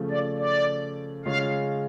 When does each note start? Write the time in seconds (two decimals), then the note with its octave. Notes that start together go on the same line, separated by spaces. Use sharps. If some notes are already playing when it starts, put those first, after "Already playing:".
Already playing: C#3 F3 A3
0.10 D5
0.39 D5
1.25 C#3 G#3 C#4 F4 F5